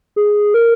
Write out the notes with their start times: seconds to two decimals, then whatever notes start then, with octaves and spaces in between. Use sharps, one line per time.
0.16 G#4
0.54 A#4